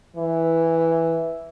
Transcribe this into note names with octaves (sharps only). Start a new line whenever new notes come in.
E3